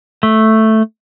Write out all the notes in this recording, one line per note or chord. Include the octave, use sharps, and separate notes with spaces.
A3